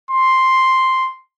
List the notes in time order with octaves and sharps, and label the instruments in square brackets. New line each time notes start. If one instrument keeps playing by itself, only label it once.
[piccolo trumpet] C6